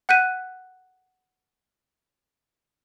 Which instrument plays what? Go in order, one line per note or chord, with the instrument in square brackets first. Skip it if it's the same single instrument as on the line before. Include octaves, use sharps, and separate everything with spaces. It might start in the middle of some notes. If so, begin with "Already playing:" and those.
[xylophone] F#5 F#6 G6 B6 D#7